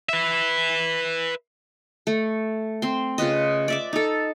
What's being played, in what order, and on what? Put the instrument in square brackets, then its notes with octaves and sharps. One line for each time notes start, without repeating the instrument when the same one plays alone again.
[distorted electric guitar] B4 E5
[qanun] A3
C4 C6
C#3 F4 B4 D#5
D5 E5 D6
D#4 A4